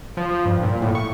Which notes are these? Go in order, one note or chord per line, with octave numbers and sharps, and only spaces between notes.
F3
G2
A#2
A2
C#6